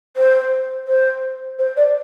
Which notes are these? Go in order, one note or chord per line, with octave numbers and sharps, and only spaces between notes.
C5
C5
C5
D5